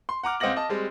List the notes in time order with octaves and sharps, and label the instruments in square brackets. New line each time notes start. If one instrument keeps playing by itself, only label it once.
[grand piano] C6
F#5 A#5 D6 F6
C#2 C4 D#5 F#5 A#6 F#7
D#5 A5
G3 G#3 C4